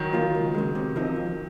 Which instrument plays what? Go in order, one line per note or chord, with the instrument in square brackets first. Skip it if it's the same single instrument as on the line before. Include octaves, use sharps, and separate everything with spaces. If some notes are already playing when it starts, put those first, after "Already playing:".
Already playing: [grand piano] D#3 F#3
[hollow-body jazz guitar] F3 A#3 F4
C#2
C#3 G#3
C3
F3 C4 D#4 A#4
F2